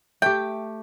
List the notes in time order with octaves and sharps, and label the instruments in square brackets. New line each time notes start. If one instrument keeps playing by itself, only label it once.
[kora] A3 G4 [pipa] G5